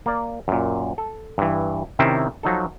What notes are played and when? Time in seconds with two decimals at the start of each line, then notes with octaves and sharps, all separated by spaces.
0.06 A#3 D5
0.48 F#2 A#2
0.98 A4
1.38 G2 E3
1.99 C3 D#3 C4 C#4 E4
2.43 F3 F#3 D#4 A4